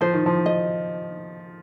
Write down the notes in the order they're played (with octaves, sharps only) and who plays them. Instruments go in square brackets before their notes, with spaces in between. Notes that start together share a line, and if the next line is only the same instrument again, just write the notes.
[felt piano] F3 [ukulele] C5
[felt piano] D#3
F3
[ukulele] D#5